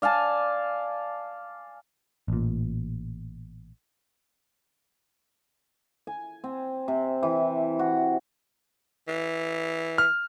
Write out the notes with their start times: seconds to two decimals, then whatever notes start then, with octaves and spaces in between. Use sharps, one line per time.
0.02 D5 F5 G#5 A5
2.28 A1 A#2
6.07 G#5
6.44 C4
6.88 C3
7.23 E3
7.79 F#4
9.08 E3
9.98 F6